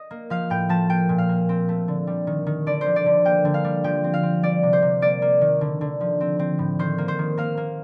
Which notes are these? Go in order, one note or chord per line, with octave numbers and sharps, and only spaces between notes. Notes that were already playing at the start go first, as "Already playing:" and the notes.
Already playing: D#5
A#3
F3 F5
A2 G5
F3 A5
A#3 G5
A#2
F5
A#3
C4
A3
D3
G3
D#3
D#3
D3 D5
F3 C5
D5
D3
A#3 G5
D3
F5
G3
F3 G5
C4
F5
C4
G3 D5
C3
C5
C3
A#3 D5
A#3
D#3
D3
D3
F3
C4
C4
A2
D#3 C5
A#3
C5
D#3
A#3 F5
A#3